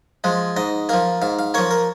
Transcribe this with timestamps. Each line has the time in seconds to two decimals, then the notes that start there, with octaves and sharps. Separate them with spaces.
0.24 F3 G#3
0.56 G#2 D#5
0.89 F3 A#3 F5
1.22 G#2 F5
1.39 F5
1.54 F3 A#3 C#5
1.71 A#4